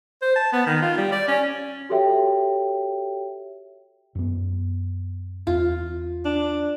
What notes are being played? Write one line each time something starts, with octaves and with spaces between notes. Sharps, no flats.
C5
A5
B3
D#3
F4
G3
D5
C#4
F#4 G4 A4 C#5 E5 G5
F#2 B3
E2 C4 F4
D4